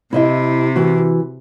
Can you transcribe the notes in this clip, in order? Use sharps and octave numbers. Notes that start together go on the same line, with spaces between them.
C3 E4 D#5 E5
E3 F#4